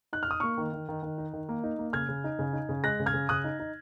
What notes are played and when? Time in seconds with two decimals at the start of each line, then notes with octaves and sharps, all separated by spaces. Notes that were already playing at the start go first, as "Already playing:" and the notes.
0.13 D#4 F#6
0.23 F6
0.28 D#4 D#6
0.40 A#3 C#6 F6
0.58 D#3
0.73 D#3
0.89 D#3
1.03 D#3
1.18 D#4
1.33 D#3
1.49 A#3
1.64 D#4
1.79 A#3
1.93 C#3 F6 G#6
2.09 C#3
2.24 D#4
2.39 C#3
2.53 D#4
2.69 C#3
2.83 G#3 F#6 A#6
3.00 C#3
3.06 F6 G#6
3.14 C#3
3.29 C#3 D#6 F#6
3.44 D#4
3.60 D#4